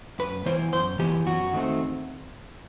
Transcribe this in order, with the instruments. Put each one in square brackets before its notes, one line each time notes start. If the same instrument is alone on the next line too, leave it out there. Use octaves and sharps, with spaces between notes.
[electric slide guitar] F#2 B4
E3 B3 E4 C5
F#2 C5
E3 B3 E4 G4
F#2 F#4
D#3 A3 C4